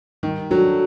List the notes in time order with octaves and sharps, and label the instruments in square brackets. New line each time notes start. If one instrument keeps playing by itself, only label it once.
[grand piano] D#3 [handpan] G3
[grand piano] F#3 [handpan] D4 F#4 A4